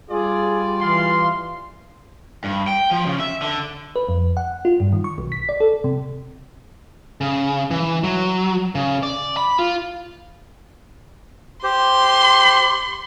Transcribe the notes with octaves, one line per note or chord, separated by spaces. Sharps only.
G3 F4 G#4 D5
E3 F5 C6
G2
G5
F3
C#3
E5
D3
B4
F2
F#5
F4
G2
D#3
C#6
B1
B6
D5
A4
C3
C#3
E3
F#3
C#3
D5
B5
F4
G4 C5 C6